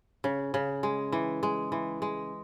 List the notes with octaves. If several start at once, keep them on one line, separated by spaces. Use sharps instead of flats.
C#3
C#3
G#3
E3
G#3
E3
G#3